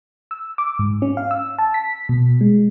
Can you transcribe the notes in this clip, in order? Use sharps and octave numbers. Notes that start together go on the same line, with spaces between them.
E6
D6
G#2
C#4
F5
E6
A5
B6
B2
G#3